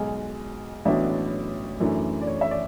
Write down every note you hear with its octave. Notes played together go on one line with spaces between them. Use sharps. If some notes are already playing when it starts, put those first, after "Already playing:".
Already playing: B1 B2 G#3 G#5
A1 A2 F#3 B3 D4 E5
F#2 E3 A3 D4
D5
C#5
E5
D5